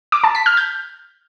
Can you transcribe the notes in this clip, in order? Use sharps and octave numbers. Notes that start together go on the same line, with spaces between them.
D6
A5
B6
F6
G6